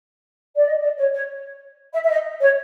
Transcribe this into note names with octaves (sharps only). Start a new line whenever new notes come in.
D5
D#5
D5
C#5
C#5
E5
E5
D#5
C#5